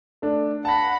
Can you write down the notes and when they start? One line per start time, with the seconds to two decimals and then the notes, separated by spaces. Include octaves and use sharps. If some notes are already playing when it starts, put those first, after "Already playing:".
0.22 A3 D4
0.65 F#5 A5 B5 A#6